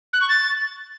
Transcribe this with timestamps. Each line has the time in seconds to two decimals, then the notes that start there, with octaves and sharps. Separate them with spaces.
0.13 F#6
0.21 C#6
0.29 A6